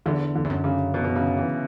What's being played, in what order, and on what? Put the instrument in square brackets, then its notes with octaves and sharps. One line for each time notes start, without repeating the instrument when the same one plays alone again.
[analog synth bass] E2 [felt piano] D3
[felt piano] D3
[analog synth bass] E2
F#2
[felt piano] C#3
B2
B2
C#3
E3